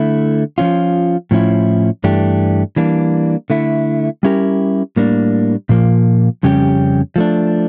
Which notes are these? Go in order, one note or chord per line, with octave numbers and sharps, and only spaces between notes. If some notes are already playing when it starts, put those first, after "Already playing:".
Already playing: D3 A3 E4
F3 C#4 F4
A2 F3 C#4 E4
G2 E3 A3 D4 G4
E3 G3 A#3 D4
D3 A3 E4
G3 C#4 E4 G4 A#4
A2 G3 A#3 D4
A#2 F3 A#3
F2 C#3 G3 C#4 G4
F3 A3 D4